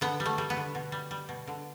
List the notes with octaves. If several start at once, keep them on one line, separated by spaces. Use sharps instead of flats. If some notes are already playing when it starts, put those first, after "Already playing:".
D3 B3
G3
A3
G3
B3
D3
B2
G3
G3
B2
D3